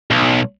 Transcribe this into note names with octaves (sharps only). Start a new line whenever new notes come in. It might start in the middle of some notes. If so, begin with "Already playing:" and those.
B1